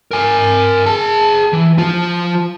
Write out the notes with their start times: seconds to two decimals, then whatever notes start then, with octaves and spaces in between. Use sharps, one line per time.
0.11 A#4 G#5
0.86 G#4 A5
1.53 E3
1.78 F3 F4